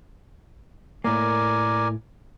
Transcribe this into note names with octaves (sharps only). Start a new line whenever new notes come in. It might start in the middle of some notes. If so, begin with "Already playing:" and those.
A2 A#3 A#4 D5 G#5